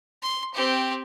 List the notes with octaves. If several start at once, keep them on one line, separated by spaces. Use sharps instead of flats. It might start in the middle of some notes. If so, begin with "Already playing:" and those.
C6
C4 G4